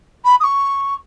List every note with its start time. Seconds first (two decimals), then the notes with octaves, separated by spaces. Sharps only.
0.24 B5
0.40 D#6
0.43 C#6